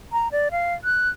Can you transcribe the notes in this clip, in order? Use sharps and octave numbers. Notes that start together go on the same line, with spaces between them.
A#5
D5
F5
F#6